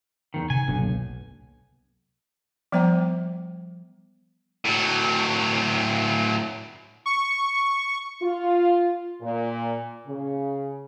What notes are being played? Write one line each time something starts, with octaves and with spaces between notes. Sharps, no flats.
E2 G#2 D#3
C3 G#5
F#1 B1 B2 D4
C2 F#2 A#3
F3 G3 B3 C5 G5 A#5
A2 F#3
C#6
F4
A#2
C#3